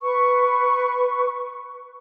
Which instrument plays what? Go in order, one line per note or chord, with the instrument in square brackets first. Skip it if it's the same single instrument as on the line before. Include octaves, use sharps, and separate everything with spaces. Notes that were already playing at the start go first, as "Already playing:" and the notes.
[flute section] B4 C#6